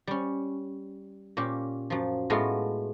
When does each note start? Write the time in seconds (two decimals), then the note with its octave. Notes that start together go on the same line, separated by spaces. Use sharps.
0.07 G3 C#4
1.37 A#2 C#4 G4
1.90 F#2 F3
2.30 A2 G#3 A3 B3 F4 F#4